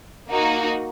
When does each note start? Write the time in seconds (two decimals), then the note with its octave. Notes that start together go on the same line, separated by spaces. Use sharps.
0.28 A#3 D#4 F#4